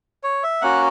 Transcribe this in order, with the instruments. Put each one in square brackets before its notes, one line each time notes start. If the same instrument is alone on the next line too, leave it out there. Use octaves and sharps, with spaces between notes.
[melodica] C#5
E5
A#3 C#4 F#4 F#5